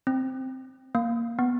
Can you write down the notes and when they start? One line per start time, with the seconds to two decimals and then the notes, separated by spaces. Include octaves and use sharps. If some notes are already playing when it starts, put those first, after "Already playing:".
0.07 C4
0.95 A#3
1.39 B3